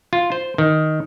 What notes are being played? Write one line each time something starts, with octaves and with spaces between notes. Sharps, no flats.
F4
C5
D#3